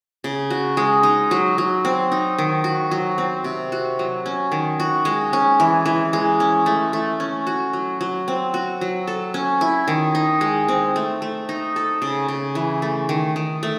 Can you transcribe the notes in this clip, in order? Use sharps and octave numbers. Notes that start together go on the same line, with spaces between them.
C#3
F#4
G#3
D#4
F#3
F#3
C4
D#4
D#3
F#4
F#3
C4
C3
F#4
F#3
C#4
D#3
F#4
G#3
C#4
E3
E3
G#3
C#4
A3
A3
C#4
F#4
F#3
F#3
C4
F#4
F#3
A4
C#4
E4
D#3
D#4
G#3
C4
A3
A3
D#4
A4
C#3
C#3
E3
A3
D#3
D#3
A3